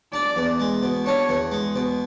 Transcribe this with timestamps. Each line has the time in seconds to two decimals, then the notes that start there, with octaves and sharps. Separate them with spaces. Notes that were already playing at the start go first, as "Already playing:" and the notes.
0.13 D4 D5
0.36 E2
0.60 G#3
0.83 B2
1.06 D4 C#5
1.29 E2
1.52 G#3
1.76 B2